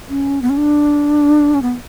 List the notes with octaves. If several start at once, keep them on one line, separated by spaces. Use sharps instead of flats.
C#4
B3
C#4
D4
C#4
B3